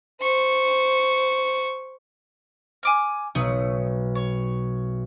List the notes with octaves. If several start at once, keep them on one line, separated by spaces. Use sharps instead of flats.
C5 C#6
G#5 D6 F6
B1 A3 D#6
C#5